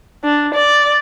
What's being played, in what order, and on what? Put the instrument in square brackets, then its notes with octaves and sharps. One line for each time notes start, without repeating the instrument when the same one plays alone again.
[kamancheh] D4
D5